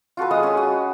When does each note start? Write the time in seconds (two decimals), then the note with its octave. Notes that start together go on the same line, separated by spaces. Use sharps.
0.17 F4 F#4 A4 B4
0.31 G#3 C6 D#6
0.43 C#4 B4
0.57 F#4